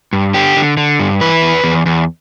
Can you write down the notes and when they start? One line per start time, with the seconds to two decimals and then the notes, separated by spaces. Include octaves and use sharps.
0.13 G2
0.34 D3 G4
0.56 D3
0.77 D3
0.99 G2
1.21 E3 B4
1.42 E2
1.64 E2
1.86 E2